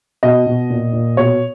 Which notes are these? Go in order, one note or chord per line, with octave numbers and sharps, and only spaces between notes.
B2 D#5
B2
A#2
A#2
B2 C#5